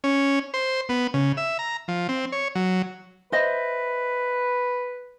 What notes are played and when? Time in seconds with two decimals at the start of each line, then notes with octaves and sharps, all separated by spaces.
0.04 C#4
0.54 C5
0.89 B3
1.14 C#3
1.37 E5
1.59 A#5
1.88 F3
2.09 C4
2.32 C#5
2.55 F#3
3.32 B4 C5 D#5 E5